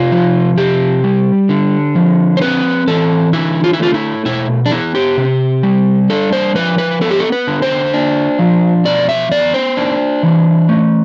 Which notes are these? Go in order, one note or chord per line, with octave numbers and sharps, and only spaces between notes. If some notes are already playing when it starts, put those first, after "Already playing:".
Already playing: C3 F4
F3
C3 G4
G3
D3
F3
C5
C4 B4
E3 A4
D3 E4
F4
E4
A3 F4
E4
B2 E4
D4
B3 E4
G4
C3
G3
D4 A4
C5
F3 B4
B4
B3 A4
G4
A4
B4
D3
C5
D4
F3
B2 D5
E5
B3 D5
C5
D4
E3
A3